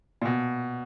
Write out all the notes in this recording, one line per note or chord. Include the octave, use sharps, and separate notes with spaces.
A#2
B2